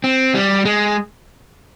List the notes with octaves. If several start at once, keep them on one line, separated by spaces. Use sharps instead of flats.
C4
G3
G#3